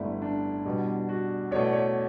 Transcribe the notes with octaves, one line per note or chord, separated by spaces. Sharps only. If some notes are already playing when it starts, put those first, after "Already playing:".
Already playing: G1 G2 D3 A3 E4
D4
E2 B2 G3
F#4
E2 B2 A3 C#5
D5
C#5